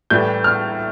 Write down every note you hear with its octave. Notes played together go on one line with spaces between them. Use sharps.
A2 E3 G3 G6
F6